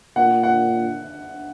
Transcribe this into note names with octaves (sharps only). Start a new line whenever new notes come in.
A#2 F#5
F#5